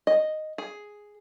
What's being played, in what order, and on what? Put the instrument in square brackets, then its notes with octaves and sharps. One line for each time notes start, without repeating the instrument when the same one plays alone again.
[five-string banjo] D#5
G#4